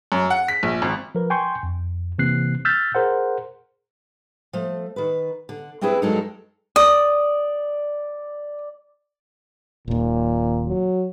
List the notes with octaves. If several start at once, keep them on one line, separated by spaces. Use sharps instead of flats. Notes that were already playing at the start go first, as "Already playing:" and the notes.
F#2
F#5
B6
A#1
G#1
F3 A#4 B4
G5 G#5 C6 C#6 G6
F2
C3 E3 A#3 C4 F#6 C7
E6 F6 G6 A6 B6
G#4 A#4 C5 F#5
F3 A3
D#3 B4
D3
A3 C4 D4 E4 G#4 B4
G2 F#3 G#3 D#4 A4 A#4
D5 D#6
D#1 D#2 A#2
F#3